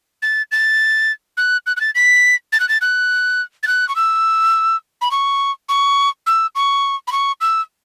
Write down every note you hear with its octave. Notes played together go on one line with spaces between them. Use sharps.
A6
A6
F#6
F#6
F#6
A6
B6
A6
F#6
A6
F#6
A6
F#6
C#6
E6
B5
C#6
C#6
E6
C#6
B5
C#6
E6